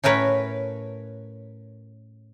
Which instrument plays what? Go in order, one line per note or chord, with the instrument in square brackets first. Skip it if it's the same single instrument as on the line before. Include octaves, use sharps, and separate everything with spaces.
[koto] A2 C#4 A#4 B4 C#5